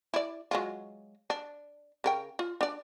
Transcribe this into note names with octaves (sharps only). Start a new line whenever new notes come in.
E4 D5
F#3 G#3 F4
D4
C#3 A#4 G5
F4
D4 D5